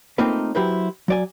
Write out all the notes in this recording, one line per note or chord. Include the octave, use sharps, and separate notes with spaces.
A3 A#3 C4 D#4 F4 B4
F#3 E4 G4 B4 C5
F#3 D5 G#5